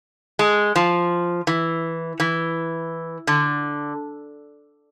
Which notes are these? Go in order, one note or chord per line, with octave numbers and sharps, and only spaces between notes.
G#3
F3
E3
E3
D3